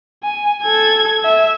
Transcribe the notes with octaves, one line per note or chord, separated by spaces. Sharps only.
G#5
A4 G#6
E5